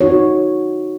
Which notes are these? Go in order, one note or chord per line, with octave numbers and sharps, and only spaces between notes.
D#4 F#4 C#5